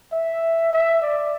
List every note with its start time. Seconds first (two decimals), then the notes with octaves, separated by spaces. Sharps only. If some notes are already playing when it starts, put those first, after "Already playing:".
0.12 E5
0.73 E5
1.02 D5